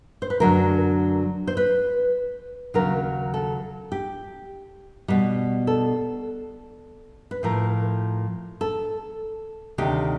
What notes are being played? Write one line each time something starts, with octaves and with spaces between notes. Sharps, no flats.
C5
B4
F#2 D3 F#3 A3 A#4
C5
B4
D#2 C#3 F#3 A#4
A4
G4
B2 G3
A4
B4
A2 F3 A3 A#4
A4
D2 C3 D#3 G4